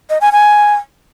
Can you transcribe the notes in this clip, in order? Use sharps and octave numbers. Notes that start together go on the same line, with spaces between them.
D#5
G#5
G#5